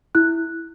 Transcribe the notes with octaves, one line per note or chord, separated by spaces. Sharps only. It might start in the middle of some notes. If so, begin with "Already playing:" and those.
E4 F#6